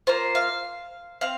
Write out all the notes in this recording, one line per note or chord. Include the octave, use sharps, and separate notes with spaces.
A#3 F4 C5
F5
C4 F5